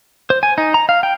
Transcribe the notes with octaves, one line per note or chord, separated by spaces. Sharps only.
C5
G#5
D#4
A#5
F5
G5